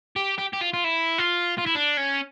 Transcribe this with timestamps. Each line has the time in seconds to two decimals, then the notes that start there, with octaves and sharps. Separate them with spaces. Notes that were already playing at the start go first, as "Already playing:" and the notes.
0.16 G4
0.38 G4
0.53 G4
0.61 F4
0.73 F4
0.84 E4
1.18 F4
1.58 F4
1.66 E4
1.75 D4
1.97 C#4